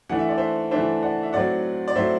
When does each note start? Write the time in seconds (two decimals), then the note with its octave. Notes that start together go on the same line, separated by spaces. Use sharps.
0.09 E3 A3 D4 F#5
0.19 E5
0.29 D5
0.38 C5 E5
0.71 E3 A3 D4 C5 E5
1.03 D5 F#5
1.23 E5
1.33 A2 F#3 C4 D5 F#5
1.88 D5
1.95 A2 F#3 C4 C5 E5